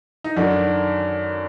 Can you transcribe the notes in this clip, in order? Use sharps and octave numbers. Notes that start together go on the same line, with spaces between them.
D#4
F#2 D3 D#3 D4